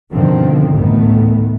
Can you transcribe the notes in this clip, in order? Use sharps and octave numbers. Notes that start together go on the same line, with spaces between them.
G2 B2 D3 D#3 F3 C4
A1 D2 G#2 D#3 A3 B3